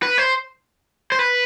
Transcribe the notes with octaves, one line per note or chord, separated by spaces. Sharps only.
B4
C5
C5
B4